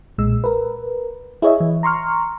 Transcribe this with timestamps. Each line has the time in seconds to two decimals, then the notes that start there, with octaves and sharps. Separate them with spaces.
0.18 B1 A#2 G#3 E6
0.44 A#4 B4
1.42 E4 G#4 C#5 D#5 E5
1.60 E3
1.83 A#5 C6 C#6 F6